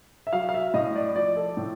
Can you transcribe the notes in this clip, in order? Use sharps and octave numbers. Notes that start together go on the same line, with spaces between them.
E5
F#3 F5
F5
E5
A2 D#5
D5
F3 D5
A4
A2